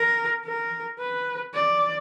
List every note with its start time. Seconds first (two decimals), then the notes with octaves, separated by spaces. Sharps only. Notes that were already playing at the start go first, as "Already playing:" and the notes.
Already playing: A#4
0.44 A#4
0.99 B4
1.54 D5